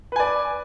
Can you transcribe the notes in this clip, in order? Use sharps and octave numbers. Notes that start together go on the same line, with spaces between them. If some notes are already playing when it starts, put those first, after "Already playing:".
B4 D5 G#5